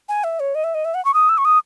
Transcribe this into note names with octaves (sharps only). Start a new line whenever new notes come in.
G#5
E5
C#5
D#5
E5
D#5
E5
F#5
C#6
D#6
E6
C#6
D#6